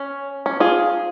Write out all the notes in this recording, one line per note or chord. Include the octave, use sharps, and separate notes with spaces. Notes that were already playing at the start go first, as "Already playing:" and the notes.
Already playing: C#4
C#4
F4 G#4